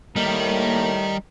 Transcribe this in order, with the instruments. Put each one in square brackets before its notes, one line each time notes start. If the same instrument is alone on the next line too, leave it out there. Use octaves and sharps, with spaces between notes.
[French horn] A2 [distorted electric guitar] G3 [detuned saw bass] A#3 [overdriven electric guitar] D#4 A#4